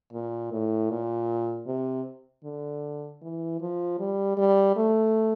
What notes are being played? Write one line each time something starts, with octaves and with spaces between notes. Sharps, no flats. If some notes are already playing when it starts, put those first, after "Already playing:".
A#2
A2
A#2
C3
D3
E3
F3
G3
G3
A3